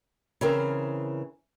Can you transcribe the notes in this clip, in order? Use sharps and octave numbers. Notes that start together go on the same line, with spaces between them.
C#3 E3 C4 A#4